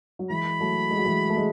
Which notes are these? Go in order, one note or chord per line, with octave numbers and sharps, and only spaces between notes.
F#3
E3 G#3 B5
F#3 A3
G#3
F#3
E3 G#3
A3
G#3